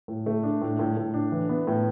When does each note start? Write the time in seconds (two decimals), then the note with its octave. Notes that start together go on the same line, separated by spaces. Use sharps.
0.08 A2
0.26 A3
0.43 D4
0.62 A2
0.79 A2
0.97 A2
1.14 D4
1.32 E3
1.49 B3
1.67 A2